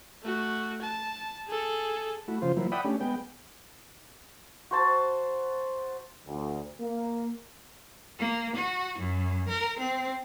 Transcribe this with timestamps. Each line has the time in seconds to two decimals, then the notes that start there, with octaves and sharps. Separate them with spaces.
0.23 A3 F#4
0.81 A5
1.48 G#4 A4
2.28 A3 E4 F#4
2.42 C#3 F3 F4 C5
2.57 F3 F#3 A#3 E4
2.72 D5 E5 F#5 G5 B5 D#6
2.85 A3 C#4 D4 G4
3.01 G#3 B3 G5
4.71 F#4 C5 A5
6.27 D2
6.81 A#3
8.19 A#3
8.56 F#4
8.99 F#2
9.49 A#4
9.79 C4